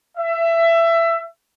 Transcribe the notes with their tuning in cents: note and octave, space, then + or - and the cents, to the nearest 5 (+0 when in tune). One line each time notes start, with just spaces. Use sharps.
E5 +20